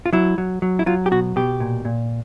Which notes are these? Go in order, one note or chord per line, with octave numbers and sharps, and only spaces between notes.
F4
F#3 E4
F#3
F#3
E4
F#3 F4
G4
B2 F#4
B2 G4
A#2
A#2